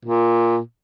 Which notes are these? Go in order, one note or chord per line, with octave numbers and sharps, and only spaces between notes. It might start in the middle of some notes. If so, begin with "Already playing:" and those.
A#2